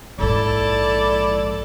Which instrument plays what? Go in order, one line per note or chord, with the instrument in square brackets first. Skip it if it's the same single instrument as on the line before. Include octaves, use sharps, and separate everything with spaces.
[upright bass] A#1 G#2 [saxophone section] E4 D5 [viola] A4 A5